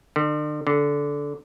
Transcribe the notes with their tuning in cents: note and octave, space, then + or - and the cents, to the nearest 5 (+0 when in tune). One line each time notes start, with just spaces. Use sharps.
D3 +40
D3 -15